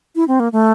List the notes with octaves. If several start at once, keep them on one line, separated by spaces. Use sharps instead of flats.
E4
C4
A#3
A3